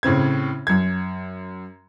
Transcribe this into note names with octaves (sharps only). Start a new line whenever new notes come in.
A2 C#3 C4 G#6
F#2 G#6